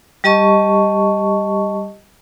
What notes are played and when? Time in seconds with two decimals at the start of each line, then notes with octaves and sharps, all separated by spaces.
0.24 G3 G4 D#5 A5 C#6